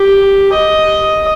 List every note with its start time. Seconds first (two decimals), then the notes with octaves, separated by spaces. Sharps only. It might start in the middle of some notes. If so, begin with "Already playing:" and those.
Already playing: G4
0.53 D#5